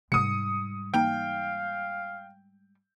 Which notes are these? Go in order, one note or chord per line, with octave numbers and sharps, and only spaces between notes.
G#2 C3 G3 D#6 C#7
E3 A#3 D#4 F5 G5